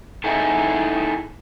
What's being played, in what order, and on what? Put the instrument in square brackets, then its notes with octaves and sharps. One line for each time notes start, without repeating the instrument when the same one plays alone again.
[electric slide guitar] D#4 E4 G#4 A4